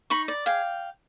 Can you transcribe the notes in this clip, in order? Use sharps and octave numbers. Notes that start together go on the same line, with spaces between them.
D#4 B5 C#6
D5
G#4 F5 G5